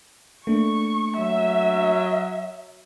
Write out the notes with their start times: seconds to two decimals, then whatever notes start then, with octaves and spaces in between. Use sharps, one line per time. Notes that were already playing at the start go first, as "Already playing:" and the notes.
0.47 A3 A#3 D4 C#6
1.18 F#3 E5